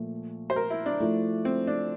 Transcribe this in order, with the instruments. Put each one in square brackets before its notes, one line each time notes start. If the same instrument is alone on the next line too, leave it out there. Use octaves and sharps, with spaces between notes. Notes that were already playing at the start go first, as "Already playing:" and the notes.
Already playing: [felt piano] A#2 F3 A3 F4
[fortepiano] C5
A#4
E4
D4
[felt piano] F3 A3 E4
[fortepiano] C4
D4